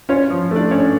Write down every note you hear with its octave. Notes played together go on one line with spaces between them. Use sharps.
C#4 F4 C#5
F3
A3 D4 D5
C#4 C#5